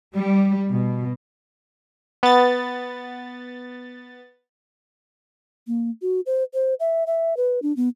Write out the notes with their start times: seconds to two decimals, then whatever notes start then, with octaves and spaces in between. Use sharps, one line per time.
0.13 G3
0.71 B2
2.23 B3 A6
5.67 A#3
6.02 F#4
6.26 C5
6.54 C5
6.80 E5
7.07 E5
7.37 B4
7.62 D4
7.77 B3